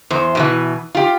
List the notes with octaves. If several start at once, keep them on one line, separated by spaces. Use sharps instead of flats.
E2 C5
B2 D#3 E3
F4 G4